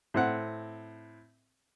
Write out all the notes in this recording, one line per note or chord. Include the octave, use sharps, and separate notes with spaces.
A2 C4 F#5